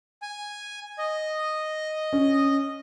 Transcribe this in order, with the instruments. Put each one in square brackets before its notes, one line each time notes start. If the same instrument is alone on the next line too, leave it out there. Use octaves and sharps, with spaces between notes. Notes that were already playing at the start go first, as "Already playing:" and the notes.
[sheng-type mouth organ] G#5
D#5
[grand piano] C#4